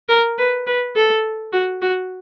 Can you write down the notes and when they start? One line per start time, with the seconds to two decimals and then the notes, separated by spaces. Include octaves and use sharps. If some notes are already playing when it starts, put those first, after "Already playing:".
0.09 A#4
0.38 B4
0.67 B4
0.96 A4
1.53 F#4
1.82 F#4